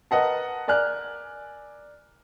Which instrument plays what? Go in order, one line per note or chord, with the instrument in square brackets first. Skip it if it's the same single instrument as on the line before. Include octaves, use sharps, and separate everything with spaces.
[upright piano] A#4 B4 D#5 F#5 A5
A#4 D5 G#5 F6 F#6